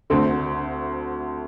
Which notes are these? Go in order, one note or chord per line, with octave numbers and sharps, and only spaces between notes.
D2 D3 A3 C4